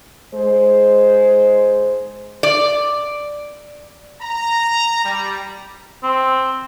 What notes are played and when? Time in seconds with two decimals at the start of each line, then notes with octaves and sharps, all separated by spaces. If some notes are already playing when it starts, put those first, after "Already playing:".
0.34 G#2 G#3 C5
2.43 D5
4.22 A#5
5.05 G3
6.03 C4